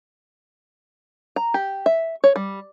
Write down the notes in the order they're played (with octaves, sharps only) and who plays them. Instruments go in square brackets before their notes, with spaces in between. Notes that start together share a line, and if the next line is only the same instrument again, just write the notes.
[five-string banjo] A#5
G4
E5
C#5
G3